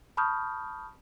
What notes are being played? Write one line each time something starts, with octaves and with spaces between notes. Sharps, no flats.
A5 B5 C#6 D#6 F6 G6